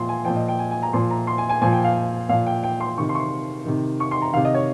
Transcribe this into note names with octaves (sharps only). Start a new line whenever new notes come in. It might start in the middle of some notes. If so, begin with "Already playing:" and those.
Already playing: A#2 F3 C6
G#5
A#2 F3 G5
D#5
G5
G#5
G#5
A#5
A#2 F3 C6
A#5
C6
G#5
G#5
A#2 F3 G#5
G5
F5
A#2 F3 F5
G5
G5
C6
C3 D#3 C#6
C6
C#6
C6
C3 D#3
C#6
C6
A#5
C3 D#3 F5
D#5
C#5